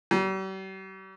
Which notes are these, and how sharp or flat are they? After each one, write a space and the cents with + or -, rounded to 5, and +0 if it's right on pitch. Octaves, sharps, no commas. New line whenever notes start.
G3 -45